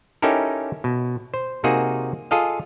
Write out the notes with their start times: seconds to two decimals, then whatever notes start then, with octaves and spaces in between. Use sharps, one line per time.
0.22 C#4 D#4 E4 G4 A4 A#4
0.84 B2
1.34 C5
1.64 C3 A#3 D#4 F#4 G#4
2.31 F4 G#4 A4 D#5 F5